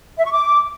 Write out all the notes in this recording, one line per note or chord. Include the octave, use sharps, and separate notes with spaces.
E5
C#6
D6